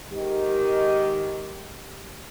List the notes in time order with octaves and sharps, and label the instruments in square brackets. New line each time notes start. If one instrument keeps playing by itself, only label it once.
[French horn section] G#2 D#3 G4